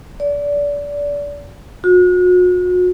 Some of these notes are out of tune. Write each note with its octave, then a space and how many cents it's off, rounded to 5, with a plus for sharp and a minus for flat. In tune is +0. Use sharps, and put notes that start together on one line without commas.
D5 -25
F#4 -40